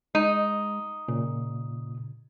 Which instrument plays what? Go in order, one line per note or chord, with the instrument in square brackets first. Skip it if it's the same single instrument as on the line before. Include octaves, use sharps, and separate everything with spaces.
[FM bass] G#3 [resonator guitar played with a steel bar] D#4
[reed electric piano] A#2 [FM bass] C#3